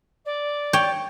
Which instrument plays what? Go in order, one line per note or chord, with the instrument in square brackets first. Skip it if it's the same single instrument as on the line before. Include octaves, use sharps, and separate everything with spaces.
[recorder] D5
[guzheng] C#5 G5